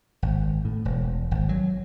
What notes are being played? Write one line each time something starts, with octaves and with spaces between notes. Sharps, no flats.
G#1
A2
E1
G#1
F#3